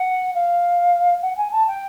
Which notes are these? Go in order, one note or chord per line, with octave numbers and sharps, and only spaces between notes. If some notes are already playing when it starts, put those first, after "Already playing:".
Already playing: F#5
F5
F#5
G#5
A5
G5